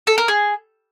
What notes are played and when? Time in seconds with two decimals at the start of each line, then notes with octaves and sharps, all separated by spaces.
0.07 A4
0.18 A#4
0.28 G#4